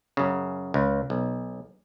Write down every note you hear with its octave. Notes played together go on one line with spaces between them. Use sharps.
F#2 C#3
C#2
B1